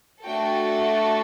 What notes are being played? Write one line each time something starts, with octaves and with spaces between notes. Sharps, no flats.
A3 D4 F#4 A4 G5